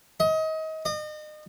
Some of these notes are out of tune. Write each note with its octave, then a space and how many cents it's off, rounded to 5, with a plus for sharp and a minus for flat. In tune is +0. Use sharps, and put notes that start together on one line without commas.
D#5 +30
D#5 -35